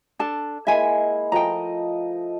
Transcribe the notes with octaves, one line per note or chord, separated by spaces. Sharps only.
D4 A4 A5
G#3 A#3 E4 E5 G#5
F3 A3 D#5 G5 A#5